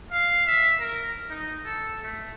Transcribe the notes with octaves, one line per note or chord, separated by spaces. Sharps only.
F5
E5
A#4
D#4
A4
A3